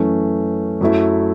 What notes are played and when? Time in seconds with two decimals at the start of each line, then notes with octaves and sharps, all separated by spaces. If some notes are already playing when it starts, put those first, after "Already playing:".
Already playing: F#2 E3 A3 C#4
0.81 F#2 F#3 A3 E4